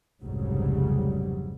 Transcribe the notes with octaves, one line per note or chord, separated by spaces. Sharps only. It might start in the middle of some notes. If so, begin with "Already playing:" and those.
F1 C2 G#2 C#3 F#3 G3